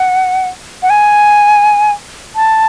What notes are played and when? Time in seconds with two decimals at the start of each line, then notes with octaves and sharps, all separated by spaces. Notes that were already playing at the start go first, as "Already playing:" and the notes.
Already playing: F#5
0.83 F#5
0.90 G#5
2.36 A5